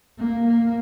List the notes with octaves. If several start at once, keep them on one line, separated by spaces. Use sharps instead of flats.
A#3
A#3